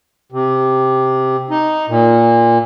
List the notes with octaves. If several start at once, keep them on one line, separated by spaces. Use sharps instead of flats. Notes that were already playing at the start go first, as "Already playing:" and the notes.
C3
D#4
A#2